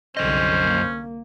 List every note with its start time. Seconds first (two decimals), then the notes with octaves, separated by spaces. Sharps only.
0.17 C2 F#2 D3 C#4 C5 D#5
0.62 A#3